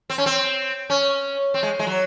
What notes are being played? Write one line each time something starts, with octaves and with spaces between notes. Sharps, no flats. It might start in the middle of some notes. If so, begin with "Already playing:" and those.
C4
C#4
C4
C#4
C4
G#3
G#3
F#3